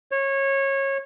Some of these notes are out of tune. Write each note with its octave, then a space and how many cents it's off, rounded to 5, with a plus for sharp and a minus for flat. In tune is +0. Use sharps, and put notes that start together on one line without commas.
C#5 -20